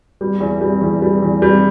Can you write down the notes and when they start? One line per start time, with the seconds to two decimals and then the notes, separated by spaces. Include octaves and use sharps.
0.21 G3
0.41 E2
0.61 G3
0.81 E2
1.02 G3
1.22 E2
1.42 G3